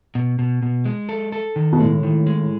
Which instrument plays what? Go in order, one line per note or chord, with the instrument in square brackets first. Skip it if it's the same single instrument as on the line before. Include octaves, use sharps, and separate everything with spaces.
[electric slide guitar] B2
B2
B2
G#3
A4
A4
D#3
[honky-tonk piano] B2
[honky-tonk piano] A2 [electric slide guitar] G#3
[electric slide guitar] D#3
G#3